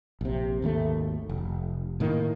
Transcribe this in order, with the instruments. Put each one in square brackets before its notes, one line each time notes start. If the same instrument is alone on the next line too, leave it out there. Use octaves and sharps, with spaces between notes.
[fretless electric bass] A#1 C3
G#1 D#2 C3 A3
F1
A2 D#3 A#3